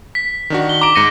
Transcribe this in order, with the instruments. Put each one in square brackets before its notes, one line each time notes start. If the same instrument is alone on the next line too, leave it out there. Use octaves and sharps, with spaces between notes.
[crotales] B6
[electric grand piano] D#3 D4 F#4
[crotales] G7
[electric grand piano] A#5 D7 [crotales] D6
[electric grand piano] G#2 C#7 D#7 [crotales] A#6